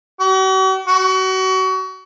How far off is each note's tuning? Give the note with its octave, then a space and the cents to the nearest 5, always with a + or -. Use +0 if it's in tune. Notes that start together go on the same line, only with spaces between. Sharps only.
F#4 +45
F#4 +30